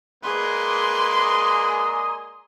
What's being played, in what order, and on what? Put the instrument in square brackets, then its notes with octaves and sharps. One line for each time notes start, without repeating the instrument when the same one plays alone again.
[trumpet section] G#3 A#3 D5 [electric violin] G#4 B4 [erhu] C6
[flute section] G#5 A#5 D#6